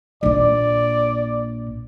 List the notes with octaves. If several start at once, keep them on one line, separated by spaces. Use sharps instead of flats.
A#1 A#2 D5